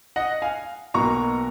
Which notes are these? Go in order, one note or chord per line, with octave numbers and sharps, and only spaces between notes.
D#5 F#5
F5 G#5
B1 B2 A#3 A#5 C#6